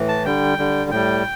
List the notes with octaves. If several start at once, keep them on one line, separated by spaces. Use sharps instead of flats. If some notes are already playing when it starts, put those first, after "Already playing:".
Already playing: A2 E3
A5
D3 G3 G5
D3 G3
A2 G3 G5